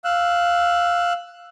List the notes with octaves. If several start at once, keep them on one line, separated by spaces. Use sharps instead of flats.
F5 E6 F#6